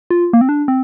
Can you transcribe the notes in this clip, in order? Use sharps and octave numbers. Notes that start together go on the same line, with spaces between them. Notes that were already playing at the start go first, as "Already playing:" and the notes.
F4
A#3
C4
D4
C4